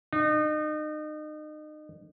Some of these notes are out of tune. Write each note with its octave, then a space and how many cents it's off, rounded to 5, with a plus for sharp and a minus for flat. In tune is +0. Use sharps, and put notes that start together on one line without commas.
D#4 -35